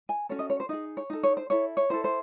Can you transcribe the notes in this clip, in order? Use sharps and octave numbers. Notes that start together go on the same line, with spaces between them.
G#5
C#4 F#4 A4 C#5
D#5
C#5
C5
D#4 G#4 D#5
C#5
D#4 A4
C#5
C5
E4 A4 C#5
C#5
E4 A4 C5
C5